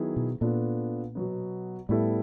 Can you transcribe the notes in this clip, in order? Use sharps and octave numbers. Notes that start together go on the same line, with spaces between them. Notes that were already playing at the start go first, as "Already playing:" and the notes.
Already playing: D#3 F#3 B3 E4 G#4
B2
A#2 B3 D4 F4 A4
B2 F#3 B3
A2 G3 B3 E4 A4